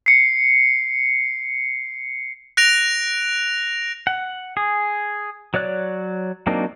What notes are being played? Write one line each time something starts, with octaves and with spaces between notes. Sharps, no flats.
C7 C#7
F#6 A#6 D7 F7
F#5
G#4
F#3 C#5 D5 F#6
F#3 A#3 C4 D4 D#4